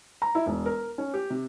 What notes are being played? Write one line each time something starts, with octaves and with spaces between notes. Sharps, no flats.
A#5
E4
E1
A#4
C#4
G4
C3